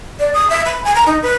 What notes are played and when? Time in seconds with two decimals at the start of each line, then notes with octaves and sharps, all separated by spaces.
0.20 D5
0.34 D#6
0.50 E5
0.66 B5
0.84 G#5
0.95 A#5
1.07 D#4
1.22 B4